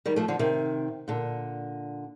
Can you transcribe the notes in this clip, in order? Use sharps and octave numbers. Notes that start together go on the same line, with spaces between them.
D#3 G3
F3 A3
D3 F3
C3 D#3
A#2 D3